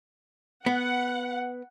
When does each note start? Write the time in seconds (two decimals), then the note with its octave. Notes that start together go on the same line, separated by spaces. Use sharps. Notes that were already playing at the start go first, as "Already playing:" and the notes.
0.66 B3 F#5